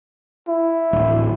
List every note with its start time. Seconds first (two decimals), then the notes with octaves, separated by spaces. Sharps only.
0.48 E4
0.93 D1 A1